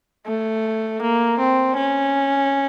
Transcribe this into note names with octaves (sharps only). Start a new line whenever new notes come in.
A3
A#3
C4
C#4